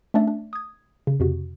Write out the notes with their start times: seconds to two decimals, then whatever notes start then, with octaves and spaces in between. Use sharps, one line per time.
0.14 A3 C#4 D4 D5 E5
0.27 D4
0.53 D#6 G#6
1.07 C#3
1.20 F2 C3 F#4